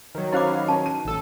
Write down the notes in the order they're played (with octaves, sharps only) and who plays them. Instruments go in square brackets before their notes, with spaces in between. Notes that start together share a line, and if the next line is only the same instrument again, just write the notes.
[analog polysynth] D#3 F#3
[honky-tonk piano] C#4 F5 B5 [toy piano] E4 C5 D6
[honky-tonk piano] C#4 C#5 [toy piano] A5
[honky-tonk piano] D#7
[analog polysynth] A1 A4